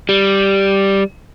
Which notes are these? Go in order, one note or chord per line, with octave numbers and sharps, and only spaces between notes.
G3